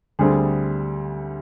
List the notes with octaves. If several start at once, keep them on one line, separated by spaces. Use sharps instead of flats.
D2 D3 G3 C4 G#4